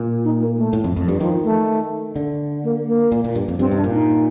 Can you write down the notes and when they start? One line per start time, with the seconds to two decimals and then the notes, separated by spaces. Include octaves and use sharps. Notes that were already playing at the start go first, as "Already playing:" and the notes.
Already playing: A#2
0.24 D#4
0.40 A#3
0.57 A3
0.73 A2
0.84 F2
0.96 F2
1.08 G2
1.20 D#3 F3
1.44 A3
2.16 D3
2.64 A#3
2.88 A#3
3.12 A#2
3.24 A#2
3.35 G2
3.48 F2
3.59 G2 C4
3.71 C3 D4
3.84 A#2
3.92 D#4